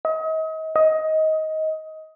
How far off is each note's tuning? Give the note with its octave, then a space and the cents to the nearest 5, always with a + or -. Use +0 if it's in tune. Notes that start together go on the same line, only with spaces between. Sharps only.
D#5 +35
D#5 +15